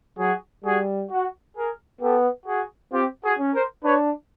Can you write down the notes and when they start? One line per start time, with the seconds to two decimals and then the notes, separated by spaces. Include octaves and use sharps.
0.18 F#3 F#4 G#4
0.64 G3 F#4 G#4
1.10 F#4
1.55 G#4 A#4
2.01 B3 G4 A4
2.46 F#4 G#4
2.92 C4 F4 G4
3.23 F#4 G#4
3.39 C#4
3.53 A#4 C5
3.84 D4 B4 C#5